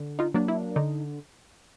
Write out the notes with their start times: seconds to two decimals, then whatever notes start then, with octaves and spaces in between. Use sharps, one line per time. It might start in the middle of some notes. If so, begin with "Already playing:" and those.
Already playing: D3
0.19 D#4 F4
0.34 F#3 A#3 D4
0.48 E4
0.76 D3 D#4